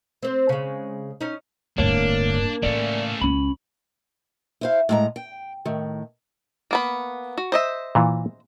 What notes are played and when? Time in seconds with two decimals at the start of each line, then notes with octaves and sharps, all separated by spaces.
0.23 C4 C5
0.49 C#3 G#3
1.21 C#4 D#4
1.78 D1 D2 G2 A#3 D4 C#5
2.63 A2 C#3 A3 C#4 D5
3.21 C#2 C#4 B5
4.61 E4 C5 F5
4.89 A2 G#3 A#5
5.16 G5
5.65 A2 D#3
6.71 A#3 B3 B5
7.38 F#4
7.52 C5 D#5 E5
7.95 A#2 E3